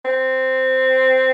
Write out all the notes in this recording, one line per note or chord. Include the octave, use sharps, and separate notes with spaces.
C4